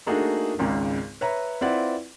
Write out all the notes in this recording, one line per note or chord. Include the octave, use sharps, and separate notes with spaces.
A3 A#3 D4 D#4 F#4 G#4
G#1 C#2 G#2 C#3
B4 C#5 E5 A#5 B5
C4 E4 F4 B4 D5 F#5